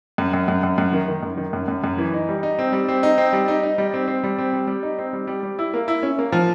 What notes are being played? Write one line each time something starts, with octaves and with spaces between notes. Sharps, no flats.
F#2
F#2
F#2
F#2
F#2
D#3
D#3
F#2
D#3
F#2
F#2
F#2
E3
D#4
G3
D#4
C4
G3
C4
D#4
C4
G3
D#4
D#4
G3
C4
C4
G3
C4
G3
G3
D#4
C4
G3
G3
G3
E4
A#3
E4
C#4
A#3
F3